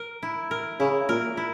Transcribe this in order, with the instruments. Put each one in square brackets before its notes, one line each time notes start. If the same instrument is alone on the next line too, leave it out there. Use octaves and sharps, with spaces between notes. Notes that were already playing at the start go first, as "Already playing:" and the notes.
Already playing: [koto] A#4
E4
A#4
[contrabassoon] C#3 [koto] E4
[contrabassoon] A#2 [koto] A#4
[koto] E4